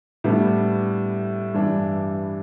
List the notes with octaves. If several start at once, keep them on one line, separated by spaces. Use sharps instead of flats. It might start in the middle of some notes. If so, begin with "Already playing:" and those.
A2 G3 B3 D4
G2 E3 G3 D4